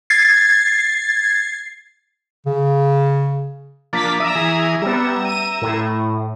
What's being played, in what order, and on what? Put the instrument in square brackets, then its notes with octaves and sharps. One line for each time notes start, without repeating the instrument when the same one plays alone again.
[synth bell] G#6 A6 C7
[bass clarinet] C#3
[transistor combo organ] F3 A#3 D4 [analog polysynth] A6 B6
[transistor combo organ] D5 D#6 [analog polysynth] E5 A#5
[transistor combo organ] E3 G#4 D#6
[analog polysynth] G3 B3 [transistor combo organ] E5 A#5
[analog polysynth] D#7
A2